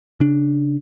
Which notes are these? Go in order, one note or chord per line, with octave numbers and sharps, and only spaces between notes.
C#3 D4